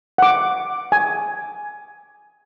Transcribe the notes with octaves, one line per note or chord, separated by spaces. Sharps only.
F#5 D6
G#5